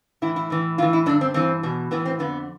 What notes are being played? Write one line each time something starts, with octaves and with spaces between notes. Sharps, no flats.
A2 E3 E4
E4
A2 E3
A2 E3 F4
E4
G2 D3 D4
C4
G2 E3 C4
E2 B2
A2 E3 B3
C4
F2 D3 B3